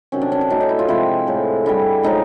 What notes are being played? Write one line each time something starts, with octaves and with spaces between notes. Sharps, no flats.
C3 D#3 F#3 C#4
D4
C#4
D4
A2 F#3 A3 D#4
D#4
E4
F4
C3 F3 G#3 E4
A2 F3 G#3
D3 G3 E4
A2 F3 G#3 D#4